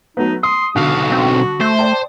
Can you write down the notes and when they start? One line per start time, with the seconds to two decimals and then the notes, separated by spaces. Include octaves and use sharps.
0.17 F#3 A3 B3 D#4
0.43 C6 D#6
0.76 B1 D3 F#4 F5
1.12 C4
1.61 A3 C5
1.79 D5 G5 A5